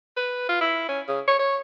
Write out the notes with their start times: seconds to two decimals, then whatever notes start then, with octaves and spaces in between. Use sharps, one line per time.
0.17 B4
0.49 F4
0.61 E4
0.89 C#4
1.08 C#3
1.27 C#5
1.39 C#5